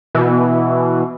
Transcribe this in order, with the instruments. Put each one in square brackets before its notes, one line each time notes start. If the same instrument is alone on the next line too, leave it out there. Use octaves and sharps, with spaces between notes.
[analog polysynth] B2 E3